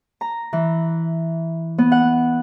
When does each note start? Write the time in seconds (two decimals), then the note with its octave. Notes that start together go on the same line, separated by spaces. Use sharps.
0.21 A#5
0.53 E3
1.78 B3
1.92 F#5